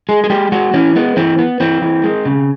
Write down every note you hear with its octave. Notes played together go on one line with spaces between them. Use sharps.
G#3 G#4
G#4
G#3 G4
G#3 F#4
E3 C#4
G#3 B3
E3 C4
B3
E3 C4
E3
G#3
C#3